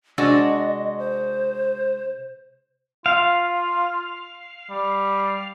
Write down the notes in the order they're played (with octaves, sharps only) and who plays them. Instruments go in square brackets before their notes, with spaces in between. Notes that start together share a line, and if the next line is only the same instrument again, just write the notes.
[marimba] C3 A6 [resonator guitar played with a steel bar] G#3 D4 F#4 [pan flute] D#5
[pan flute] C5
[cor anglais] F4 [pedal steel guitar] F5
[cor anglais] G3